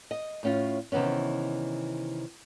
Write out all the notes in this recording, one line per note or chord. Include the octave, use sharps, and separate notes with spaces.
D#5
A2 C#4 F4
C3 D#3 E3 B3 C#4